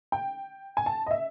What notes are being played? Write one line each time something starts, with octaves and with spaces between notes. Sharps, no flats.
G5
G#5
A5
D#5
E5